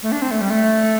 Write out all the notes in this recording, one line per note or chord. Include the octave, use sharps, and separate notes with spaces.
A3
D4
C4
A3
G3
A3